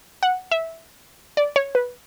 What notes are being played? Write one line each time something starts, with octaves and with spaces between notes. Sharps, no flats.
F#5
E5
D5
C#5
B4